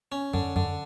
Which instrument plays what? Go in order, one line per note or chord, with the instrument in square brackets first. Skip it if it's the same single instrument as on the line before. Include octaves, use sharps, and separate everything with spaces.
[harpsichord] C#4
[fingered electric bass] F#2 [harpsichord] D3
[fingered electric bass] F#2 [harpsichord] D3